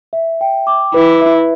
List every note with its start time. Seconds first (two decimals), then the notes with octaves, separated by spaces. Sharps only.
0.13 E5
0.41 G5
0.67 D6
0.94 E4 B4
1.21 E5